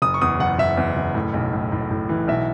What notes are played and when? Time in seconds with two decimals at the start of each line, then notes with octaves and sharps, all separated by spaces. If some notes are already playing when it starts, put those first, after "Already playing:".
0.02 F#1 D#6
0.14 C#6
0.22 E2 D#6
0.40 F#1 F#5
0.58 F#1 E5
0.77 E2
0.96 F#1
1.15 A2
1.34 B1
1.53 A2
1.72 A2
1.91 A2
2.09 E3
2.28 B1 E5